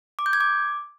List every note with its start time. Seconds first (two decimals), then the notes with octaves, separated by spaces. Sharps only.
0.19 D6
0.26 G6
0.33 G#6
0.40 D6